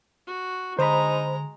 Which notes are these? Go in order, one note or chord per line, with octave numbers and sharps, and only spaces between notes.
F#4
D3 G#3 D#4 C5 A#5 B5